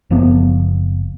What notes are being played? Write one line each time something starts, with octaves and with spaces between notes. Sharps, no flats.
F#1 F3 A#3 B3